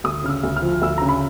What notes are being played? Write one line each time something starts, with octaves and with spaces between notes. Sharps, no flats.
D2 D#6
C#3 F6
E6
D2
F6
F3
D2 E6
C#3 A#5
B5